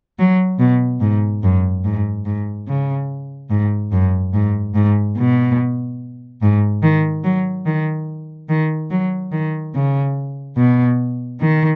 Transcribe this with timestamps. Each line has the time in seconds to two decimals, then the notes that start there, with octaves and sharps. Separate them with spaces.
0.19 F#3
0.59 B2
1.01 G#2
1.43 F#2
1.84 G#2
2.25 G#2
2.68 C#3
3.50 G#2
3.92 F#2
4.34 G#2
4.75 G#2
5.17 B2
6.42 G#2
6.82 D#3
7.24 F#3
7.66 D#3
8.49 D#3
8.90 F#3
9.32 D#3
9.74 C#3
10.57 B2
11.40 D#3